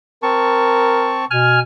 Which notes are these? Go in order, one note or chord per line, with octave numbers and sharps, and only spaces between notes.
C4 A#4 A5 C#6
B2 G#5 F6